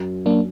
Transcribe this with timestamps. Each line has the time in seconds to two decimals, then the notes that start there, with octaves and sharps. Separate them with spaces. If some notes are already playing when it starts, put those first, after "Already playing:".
Already playing: F#2
0.26 F#3 A#3 D4